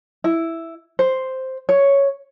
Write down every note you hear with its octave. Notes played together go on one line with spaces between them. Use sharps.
E4
C5
C#5